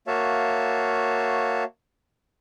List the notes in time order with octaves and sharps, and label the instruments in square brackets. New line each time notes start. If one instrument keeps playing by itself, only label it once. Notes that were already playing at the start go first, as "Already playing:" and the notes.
[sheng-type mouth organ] A#3 F#4 C#5 E5 F5 A5